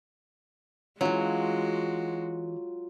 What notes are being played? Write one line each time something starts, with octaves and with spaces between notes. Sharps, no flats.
E3 F#3 G#3 C#4 F4 F#4